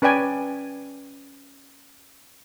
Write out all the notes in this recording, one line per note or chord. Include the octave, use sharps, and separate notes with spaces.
C#4 B4 D5 G5 G#5